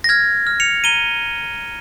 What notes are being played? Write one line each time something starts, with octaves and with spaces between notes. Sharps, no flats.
A#6
F6 G#6
F6
C#7 F7
A#5 D#7 G7